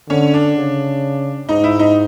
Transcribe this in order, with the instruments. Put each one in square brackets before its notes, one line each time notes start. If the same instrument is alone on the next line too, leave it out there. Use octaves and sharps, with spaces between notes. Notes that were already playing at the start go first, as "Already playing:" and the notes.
[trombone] D3 [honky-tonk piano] C#4
[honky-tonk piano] D4
[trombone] C#3
[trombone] G#2 [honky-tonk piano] D#4
[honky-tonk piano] E4
D#4